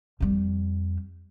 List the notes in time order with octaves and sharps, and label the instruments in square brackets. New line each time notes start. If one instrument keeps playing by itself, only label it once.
[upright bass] F2 G3